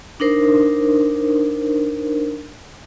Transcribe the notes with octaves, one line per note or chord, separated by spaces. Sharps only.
D4 D#4 A#4 C5